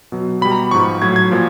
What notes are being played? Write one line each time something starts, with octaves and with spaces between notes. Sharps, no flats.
B2 F#3
B2 G3 B5
A#5
G#2 F3 C#6
A2 F#3 G#6
G#6
A#2 F3